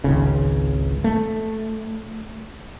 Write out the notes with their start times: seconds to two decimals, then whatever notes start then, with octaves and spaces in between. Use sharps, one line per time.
0.04 G#1 C#2 C#3
1.04 A3